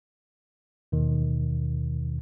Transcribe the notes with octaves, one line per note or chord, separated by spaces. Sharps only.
D#2 B2 D#3